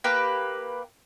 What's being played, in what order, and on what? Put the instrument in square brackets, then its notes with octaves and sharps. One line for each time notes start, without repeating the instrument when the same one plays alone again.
[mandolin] A#3 G4 B4 A#5